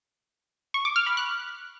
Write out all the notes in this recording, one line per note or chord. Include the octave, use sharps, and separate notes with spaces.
C#6
D6
F6
B5
F#6